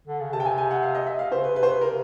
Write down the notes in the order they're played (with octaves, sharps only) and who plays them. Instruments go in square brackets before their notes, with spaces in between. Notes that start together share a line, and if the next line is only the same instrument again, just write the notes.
[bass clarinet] D3
C#3
[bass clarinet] C3 [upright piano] A5
[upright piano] G5
G#5
G#5
F#5
F5
D#5
E5
F5
[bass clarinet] C#3 [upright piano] C5
[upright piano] B4
[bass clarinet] C3 [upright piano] B4
[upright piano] C5
B4
A#4